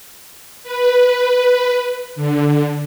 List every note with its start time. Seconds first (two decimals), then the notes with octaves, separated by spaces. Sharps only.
0.63 B4
2.16 D3